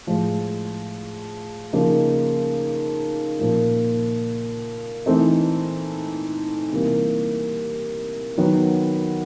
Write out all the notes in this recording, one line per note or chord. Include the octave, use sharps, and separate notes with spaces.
A2 F3 G#3
C#3 F3 A#3 D#4
A#2 F3 A#3
E3 A3 C4 D#4
C3 E3 G3 A#3
D#3 F#3 B3